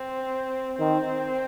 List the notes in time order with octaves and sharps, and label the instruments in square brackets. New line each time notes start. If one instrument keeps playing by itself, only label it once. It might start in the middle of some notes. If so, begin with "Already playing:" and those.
Already playing: [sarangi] C4
[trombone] D#3 [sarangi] C4